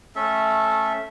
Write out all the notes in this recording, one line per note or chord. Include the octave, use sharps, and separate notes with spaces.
A3 C#4 A4 E5